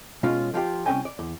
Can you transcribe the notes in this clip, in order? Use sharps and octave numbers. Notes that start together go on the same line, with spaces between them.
B2 G#3 C#4 F4
F3 F4 G4
C2 F#2 C#4 G5 G#5
D5
E2